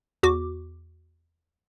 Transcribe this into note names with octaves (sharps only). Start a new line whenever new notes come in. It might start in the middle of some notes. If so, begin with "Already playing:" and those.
E2 F#4 D6